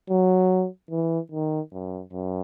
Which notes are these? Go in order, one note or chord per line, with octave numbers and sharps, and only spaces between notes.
F#3
E3
D#3
F#2
F#2